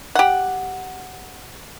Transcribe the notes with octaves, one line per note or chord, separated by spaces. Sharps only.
G4 F#5